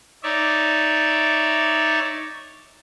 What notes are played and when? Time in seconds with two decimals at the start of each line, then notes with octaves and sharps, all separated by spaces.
0.23 D#4 C#5 D5 E5